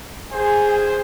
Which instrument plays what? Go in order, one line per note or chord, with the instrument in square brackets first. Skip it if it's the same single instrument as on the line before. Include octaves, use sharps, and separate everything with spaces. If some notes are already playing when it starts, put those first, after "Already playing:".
[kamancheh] G#4 G#5 [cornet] C5